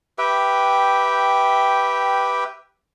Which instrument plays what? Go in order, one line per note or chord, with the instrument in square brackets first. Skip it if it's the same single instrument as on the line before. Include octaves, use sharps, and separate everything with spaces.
[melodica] G4 B4 E5 G5